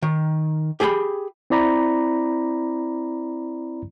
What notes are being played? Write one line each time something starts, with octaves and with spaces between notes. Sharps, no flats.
D#3
G4 G#4 G5 G#5 B5
C4 E4 D5 A#5 B5